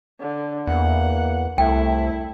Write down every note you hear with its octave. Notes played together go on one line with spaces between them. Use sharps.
D3
E2 A#3 F#5
C2 A3 E4 G5